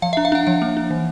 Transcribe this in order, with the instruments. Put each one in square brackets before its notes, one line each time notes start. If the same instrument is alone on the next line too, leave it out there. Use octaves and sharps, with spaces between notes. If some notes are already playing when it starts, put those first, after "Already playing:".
[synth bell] F3 F5
E5
D4
F5
D4 F#5
F3 F#5
A#3
D4
E3